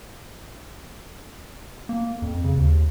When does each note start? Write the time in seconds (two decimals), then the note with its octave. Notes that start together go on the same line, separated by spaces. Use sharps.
1.89 A#3
2.22 F2
2.44 C#3
2.57 D#2